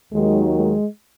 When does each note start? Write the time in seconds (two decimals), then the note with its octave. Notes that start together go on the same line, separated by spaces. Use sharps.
0.11 D#2 D#3 F#3 G#3
0.55 G#3